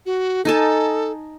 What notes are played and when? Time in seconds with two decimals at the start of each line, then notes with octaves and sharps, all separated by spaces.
0.06 F#4
0.45 D#4 A4 G#5 A5